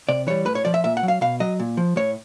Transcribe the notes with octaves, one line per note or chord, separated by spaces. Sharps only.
C3 D5
E3 G3 C#5
A2 B4
C#5
F3 D5
E5
A#2 E5
F#5
F#3
F5
B2 F5
F#3 D#5
A#2
F3
A2 C#5